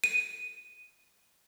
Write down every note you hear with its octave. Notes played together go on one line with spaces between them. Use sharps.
D#7